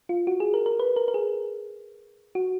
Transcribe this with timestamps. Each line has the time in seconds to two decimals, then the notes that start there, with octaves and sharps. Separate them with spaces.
0.09 F4
0.27 F#4
0.40 G#4
0.54 A#4
0.66 A#4
0.79 B4
0.96 A#4
1.08 A#4
1.14 G#4
2.35 F#4